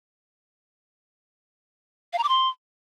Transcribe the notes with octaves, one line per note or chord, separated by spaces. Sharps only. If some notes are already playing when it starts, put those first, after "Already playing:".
F5
A#5
D6
C6